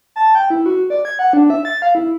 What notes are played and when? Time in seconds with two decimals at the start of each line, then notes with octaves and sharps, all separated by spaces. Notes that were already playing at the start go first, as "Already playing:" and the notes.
0.16 A5
0.35 G5
0.50 E4
0.66 F#4
0.90 D5
1.05 G#6
1.19 F#5
1.33 D4
1.50 E5
1.65 A6
1.82 F5
1.95 E4